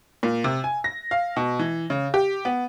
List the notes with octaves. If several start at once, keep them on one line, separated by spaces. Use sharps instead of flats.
A#2
C3
G#5
A#6
F5
B2
E3
C#3
G4
B3